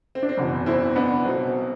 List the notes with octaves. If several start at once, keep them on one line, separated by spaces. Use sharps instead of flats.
C4
D4
C4
F#1 E2 B2
C4 E4
B3 D4
B1 B2 F#3 C4
C4